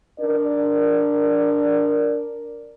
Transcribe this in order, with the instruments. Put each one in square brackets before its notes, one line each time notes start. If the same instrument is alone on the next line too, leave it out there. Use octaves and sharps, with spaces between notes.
[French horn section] D4 A#4 D5